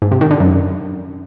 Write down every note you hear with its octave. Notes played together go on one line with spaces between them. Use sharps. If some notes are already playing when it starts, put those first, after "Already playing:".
G#2
C3
D#3
D3
F#2